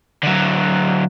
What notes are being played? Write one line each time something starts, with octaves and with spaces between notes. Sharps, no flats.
D3 F#3